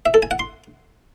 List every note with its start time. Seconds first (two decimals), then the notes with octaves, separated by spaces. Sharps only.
0.06 E5
0.14 A4
0.22 G#5
0.31 F#5
0.39 C6